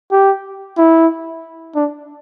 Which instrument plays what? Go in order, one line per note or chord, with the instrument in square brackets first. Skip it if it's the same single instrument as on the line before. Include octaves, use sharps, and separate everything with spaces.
[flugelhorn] G4
E4
D4